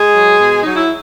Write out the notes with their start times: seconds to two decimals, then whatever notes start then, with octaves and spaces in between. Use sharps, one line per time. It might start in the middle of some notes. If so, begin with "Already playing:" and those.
Already playing: G#3 G#4
0.15 F#3
0.39 B2
0.62 F#3 D#4
0.76 E4